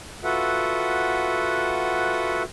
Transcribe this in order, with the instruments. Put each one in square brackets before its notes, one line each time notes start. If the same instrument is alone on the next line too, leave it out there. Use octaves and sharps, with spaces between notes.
[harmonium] F4 F#4 A4 B4 E5 F#5